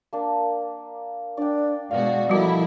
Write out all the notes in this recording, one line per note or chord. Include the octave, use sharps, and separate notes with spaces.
A#3 D4
D4 D5 G5
B2 G#3 F#4 D5 F5 F#5
F3 G3 E4 F#4 A4 A#4 D#5